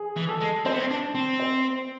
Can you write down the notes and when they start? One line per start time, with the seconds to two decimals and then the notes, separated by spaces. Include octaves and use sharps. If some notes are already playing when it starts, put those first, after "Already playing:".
Already playing: G#4
0.16 E3
0.29 A4
0.40 G#3
0.65 C4 C5
0.73 B3
0.80 C4
0.91 D4
1.15 C4
1.40 C5